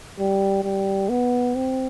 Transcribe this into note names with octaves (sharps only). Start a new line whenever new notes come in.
G3
G3
B3
C4